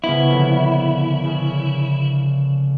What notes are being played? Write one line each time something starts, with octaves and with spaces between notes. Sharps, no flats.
C#3 B3 E4
A#1 D3
C#3